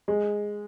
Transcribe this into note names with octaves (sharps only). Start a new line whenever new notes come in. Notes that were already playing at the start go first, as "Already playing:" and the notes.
G#3